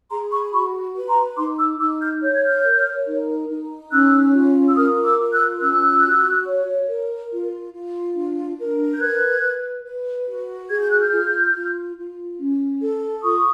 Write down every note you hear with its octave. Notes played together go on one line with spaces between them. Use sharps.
G#4 A#5 C6
B5 C#6
F#4 B5 C#6
B4
A#5 C6
D#4 C6 D6
D6 E6
D#4 D6 E6
F6 G6
C#5 G6
G#6
F6 G6
A#4
D#4
D#4
C#4 E6 F#6
F4
E6
A#4 D#6 F6
D6 E6
F4
E6 F#6
C#4 E6 F#6
F#4
C#5
A#4
F4
F4
D4
A#4
G6
B4 F#6 G#6
B4
B4
F#4
G#4 G#6
G6
F#6
F6 G6
F4
F4
F4
C#4
A4
F4 C#6 D#6